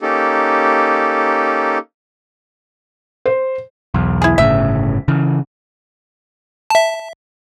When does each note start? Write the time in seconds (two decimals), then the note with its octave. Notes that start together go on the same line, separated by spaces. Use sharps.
0.01 A#3 C#4 D#4 G4 A4
3.26 C5
3.94 B1 E2
4.22 E4 G#4
4.38 G1 A2 C#3 E5
5.08 C#3 E3
6.70 E5 A5